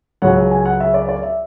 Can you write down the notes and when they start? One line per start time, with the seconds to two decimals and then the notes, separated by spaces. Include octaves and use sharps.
0.22 C#2 C#3 F#3 F#5
0.51 G#5
0.65 F#5
0.80 E5
0.94 D5
1.09 D5
1.23 E5